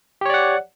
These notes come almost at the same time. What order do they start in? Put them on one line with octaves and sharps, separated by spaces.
G4 C#5 D5 F#5